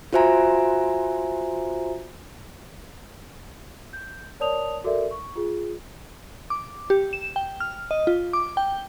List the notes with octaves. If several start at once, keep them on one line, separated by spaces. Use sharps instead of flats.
F4 F#4 C5 E5 G#5 A#5
G6
A#4 C#5 D5 A5 D#6 F7
F#4 A4 A#4 D5 E5
C#6
F4 G#4
D6
G4
E7
G5
F6
D#5
F4
D6
G5